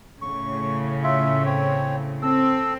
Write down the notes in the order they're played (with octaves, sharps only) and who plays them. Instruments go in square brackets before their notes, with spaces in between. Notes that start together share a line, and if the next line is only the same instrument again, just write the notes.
[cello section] A2 C#3 [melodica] C#6
[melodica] F4 E5
C4 C#5
[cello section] C4 [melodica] A4 E6